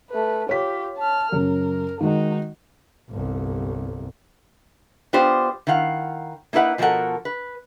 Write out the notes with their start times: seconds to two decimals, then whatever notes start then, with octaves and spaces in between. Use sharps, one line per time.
0.10 A3 B4
0.49 F4 G4 C#5 B6
0.98 A5 F6
1.32 F#2 C#3 C#4 A#4
2.01 D#3 G#3 D#4 F#4
3.09 G1 C2
5.13 B3 F4 G4 C5 D5
5.67 D#3 E4 F5 F#5
6.53 A#3 D#4 E4 B4 F#5
6.78 B2 F3 G3 A4 A#4 F#5
7.25 B4